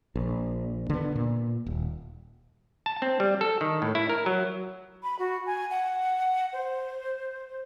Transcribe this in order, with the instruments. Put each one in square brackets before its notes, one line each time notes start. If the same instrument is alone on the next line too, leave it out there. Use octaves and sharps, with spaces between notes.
[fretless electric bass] A#1
D3 B3
A#2
D#1
[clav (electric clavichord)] A5
C4
G3
A4
D#3
A2
E4
A#4
F#3
[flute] B5
F#4
G#5
F#5
C5